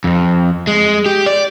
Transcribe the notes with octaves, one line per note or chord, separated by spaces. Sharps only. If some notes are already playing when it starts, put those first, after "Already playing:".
F2
G#3
G4
D5